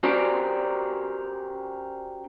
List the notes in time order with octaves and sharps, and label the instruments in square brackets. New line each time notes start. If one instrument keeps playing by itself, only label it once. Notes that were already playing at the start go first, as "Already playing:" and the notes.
[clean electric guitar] C#4 F#4 G4 A#4 C5 D5